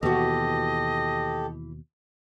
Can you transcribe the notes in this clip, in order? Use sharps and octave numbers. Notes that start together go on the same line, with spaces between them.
D#2 B2 E3 F#4 G4 A4 D#5